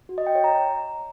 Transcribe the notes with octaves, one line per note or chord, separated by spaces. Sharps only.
F#4
D#5
G5
C#5
A#5